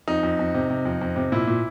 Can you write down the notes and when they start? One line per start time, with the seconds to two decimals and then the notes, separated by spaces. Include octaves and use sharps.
0.08 F2 D#4
0.23 F2
0.39 F2
0.54 C3
0.70 C3
0.85 F2
1.01 F2
1.16 C3
1.32 A#2 E4
1.47 A#2